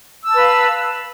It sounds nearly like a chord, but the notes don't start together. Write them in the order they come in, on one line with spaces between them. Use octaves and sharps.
E6 A5 B4 F5